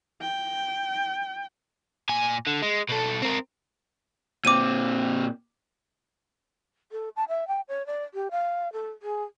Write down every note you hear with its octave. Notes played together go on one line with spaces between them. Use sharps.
G5
A#2 G#5
D3
G#3
B2 A4
C4 A#4
A#2 C4 D6 D#7
A4
A5
E5
G5
C#5
D5
G4
F5
A4
G#4